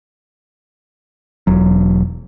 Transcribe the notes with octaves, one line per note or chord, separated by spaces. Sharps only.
E1 F#3